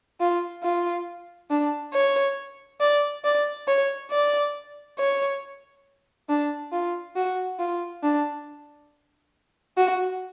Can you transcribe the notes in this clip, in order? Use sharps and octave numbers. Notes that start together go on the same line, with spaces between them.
F4
F4
D4
C#5
D5
D5
C#5
D5
C#5
D4
F4
F#4
F4
D4
F#4